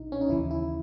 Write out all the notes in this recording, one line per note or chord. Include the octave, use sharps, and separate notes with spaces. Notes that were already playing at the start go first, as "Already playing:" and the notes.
Already playing: B1 A#2 D#4
C#4
D#4
D#2 C#3 E3 E4
E4